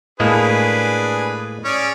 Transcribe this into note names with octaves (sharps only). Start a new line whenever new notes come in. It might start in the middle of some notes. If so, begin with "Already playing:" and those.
A2 G#3 A#3 D4 G#4 B4
C#4 G#4 D5